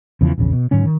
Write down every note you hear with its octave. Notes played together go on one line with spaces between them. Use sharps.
E2 C#3 E3 F3
A#1 E2 C#3
B2
G#2 D3 F#3 C#4
D#3